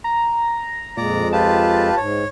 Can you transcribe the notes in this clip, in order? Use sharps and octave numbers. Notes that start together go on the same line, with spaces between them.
A#5
F2 A#2 G#3 D5 A#5
F4 G4 B4 A5
G#2 C#5